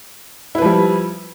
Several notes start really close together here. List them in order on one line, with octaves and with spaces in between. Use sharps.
E4 B4 F3 G3